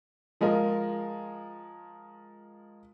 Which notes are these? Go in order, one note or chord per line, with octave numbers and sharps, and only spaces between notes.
F3 G#3 F4 A#4